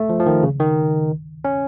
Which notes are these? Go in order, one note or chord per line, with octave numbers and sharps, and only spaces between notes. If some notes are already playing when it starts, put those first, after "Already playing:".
Already playing: A3
F3
F3
D#3
C#3
D#3
C#4